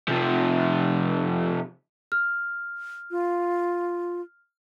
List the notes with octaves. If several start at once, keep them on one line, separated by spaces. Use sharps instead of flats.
C3 F3
F6
F4